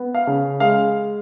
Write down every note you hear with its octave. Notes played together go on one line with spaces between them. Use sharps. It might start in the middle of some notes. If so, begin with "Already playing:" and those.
Already playing: B3
F5
C#3
G#3 F5